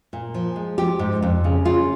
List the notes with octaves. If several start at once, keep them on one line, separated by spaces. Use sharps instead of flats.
A#2
F3
G#3
F3 G4
G#2
F2
C#3
C#3 F4